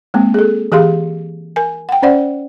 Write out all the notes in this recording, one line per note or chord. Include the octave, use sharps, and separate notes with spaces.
G#3 A#3 C4
G#4 A4
E3 G4 G#4 F5 C6
A#4 G#5
F#5 G5
C#4 C5 D5 F#5